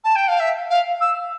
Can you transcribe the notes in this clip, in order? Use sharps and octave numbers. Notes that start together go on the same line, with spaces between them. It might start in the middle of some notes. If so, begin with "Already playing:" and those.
A5
G5
F5
E5
F5
E6